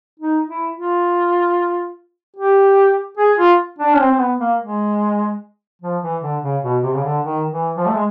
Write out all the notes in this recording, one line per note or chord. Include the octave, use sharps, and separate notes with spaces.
D#4
E4
F4
G4
G#4
F4
D4
C#4
C4
C4
B3
A#3
G#3
F3
E3
D3
C#3
B2
C3
C#3
D3
D#3
E3
F3
A3
G#3